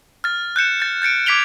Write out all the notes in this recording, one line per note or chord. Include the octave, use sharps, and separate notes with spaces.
F6 A6
F#6 G6 C#7 E7
G6 A6
G6 A6 C#7 D7
D6 G#6 B6 D7 F7 G7